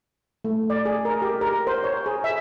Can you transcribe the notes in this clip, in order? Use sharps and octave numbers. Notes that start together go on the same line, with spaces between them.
A3
D5
G#4
A#4
G4
A#4
C5
C#5
G#4
E5